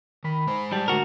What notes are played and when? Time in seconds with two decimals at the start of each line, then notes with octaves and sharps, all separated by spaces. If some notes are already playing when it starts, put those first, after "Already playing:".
0.24 D#3 B5
0.47 G#3 C5
0.72 G3 A5
0.88 D2 F#4 A#4